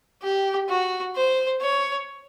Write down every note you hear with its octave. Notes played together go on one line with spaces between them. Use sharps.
G4
F#4
C5
C#5